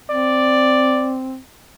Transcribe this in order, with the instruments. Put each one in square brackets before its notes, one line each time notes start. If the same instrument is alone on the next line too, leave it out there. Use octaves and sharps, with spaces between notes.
[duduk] C4 [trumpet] D5